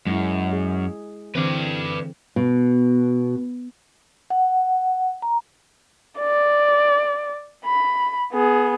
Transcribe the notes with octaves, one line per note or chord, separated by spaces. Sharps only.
F#2 G#3 E4
G#4
D3 E3 C4 B4 D5
B2
F#5
A#5
D5
B5
B3 G#4